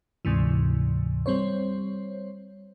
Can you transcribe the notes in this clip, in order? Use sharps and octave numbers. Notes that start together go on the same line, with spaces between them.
D2 G#2 C3 E3
G3 C4 C5 C#5